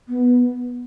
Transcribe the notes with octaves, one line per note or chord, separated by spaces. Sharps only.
B3